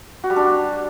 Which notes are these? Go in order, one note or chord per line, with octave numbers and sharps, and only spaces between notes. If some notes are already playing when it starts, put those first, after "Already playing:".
F#4
G3
D4